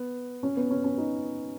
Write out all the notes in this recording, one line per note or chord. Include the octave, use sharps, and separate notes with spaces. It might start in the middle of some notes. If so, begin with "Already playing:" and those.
Already playing: B3
C#4
B3
C#4
C#4
D#4